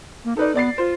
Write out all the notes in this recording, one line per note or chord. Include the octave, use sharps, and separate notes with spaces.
A#3
D#4 A4 B4 D5
B3 D5 A6 C7
F4 C5